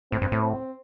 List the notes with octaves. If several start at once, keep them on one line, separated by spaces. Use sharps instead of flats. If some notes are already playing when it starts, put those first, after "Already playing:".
A2 C4
G2
A2
C4